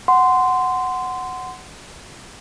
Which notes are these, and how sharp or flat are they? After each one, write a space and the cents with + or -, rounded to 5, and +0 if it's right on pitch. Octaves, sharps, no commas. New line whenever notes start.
F#5 +0 C6 -15